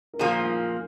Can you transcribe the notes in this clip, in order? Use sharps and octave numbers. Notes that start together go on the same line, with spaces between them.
A#4
A#2 F3 A#3 G#4
F5